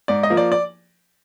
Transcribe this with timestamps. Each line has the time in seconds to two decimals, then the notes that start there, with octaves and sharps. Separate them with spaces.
0.08 G#2 D5
0.23 D#5
0.30 F3 A#3
0.37 D5
0.52 D5